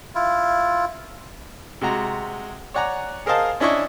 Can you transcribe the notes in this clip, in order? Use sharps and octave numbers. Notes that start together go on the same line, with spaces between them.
E4 F4
C3 G#3 F#4 A#5
C#5 D5 F#5 G#5 A#5
G#4 A#4 C5 D#5 F5 A5
C#4 D4 E4 D#5 C#6